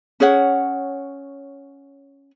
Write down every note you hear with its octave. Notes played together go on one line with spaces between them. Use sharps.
C#4 G#4 C#5 F#5